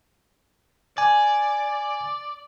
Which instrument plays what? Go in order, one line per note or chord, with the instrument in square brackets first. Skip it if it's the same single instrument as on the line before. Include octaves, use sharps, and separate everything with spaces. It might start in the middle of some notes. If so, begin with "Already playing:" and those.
[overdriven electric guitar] D5 [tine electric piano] G#5